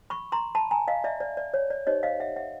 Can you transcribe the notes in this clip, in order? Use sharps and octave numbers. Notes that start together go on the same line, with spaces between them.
B5 C#6
A#5 C6
A5 B5
G#5 A#5
D#5 F5
D5 E5
D5
D5
C#5
D5
D#4 G4 C5 C#5 D#5
D#5 F5
E5 F#5
E5 F#5